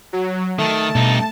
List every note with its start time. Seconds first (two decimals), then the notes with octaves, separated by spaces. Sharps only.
0.13 F#3
0.59 D#3 A3 A5
0.95 G2 B2 D#4